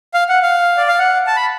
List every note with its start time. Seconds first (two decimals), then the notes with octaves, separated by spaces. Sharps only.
0.14 F5
0.29 F#5
0.43 F5
0.77 D5
0.88 F5
0.99 F#5
1.27 A5
1.36 B5